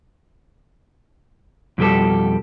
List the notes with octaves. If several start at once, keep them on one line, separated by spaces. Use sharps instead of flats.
F2 B2 G3 G4 A4